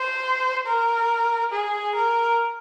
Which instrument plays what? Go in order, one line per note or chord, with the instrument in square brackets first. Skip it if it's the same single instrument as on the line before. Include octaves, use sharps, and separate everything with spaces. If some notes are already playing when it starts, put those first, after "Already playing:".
Already playing: [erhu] C5
A#4
G#4
A#4